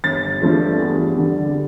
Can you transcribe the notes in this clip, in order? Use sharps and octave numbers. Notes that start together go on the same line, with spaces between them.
G1 A6
G2 F3 A3
E2
D3 G3